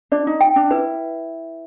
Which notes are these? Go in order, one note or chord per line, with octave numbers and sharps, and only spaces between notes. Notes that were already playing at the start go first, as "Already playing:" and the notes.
D4 D5
D#4
G5
D4
E4 B4